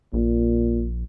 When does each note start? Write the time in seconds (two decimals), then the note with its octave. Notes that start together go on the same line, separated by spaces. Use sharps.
0.13 A#1 A#2